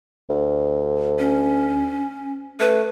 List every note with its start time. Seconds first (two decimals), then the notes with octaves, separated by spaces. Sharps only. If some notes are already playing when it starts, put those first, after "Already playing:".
0.30 D2
1.19 C#4
2.60 A3 B4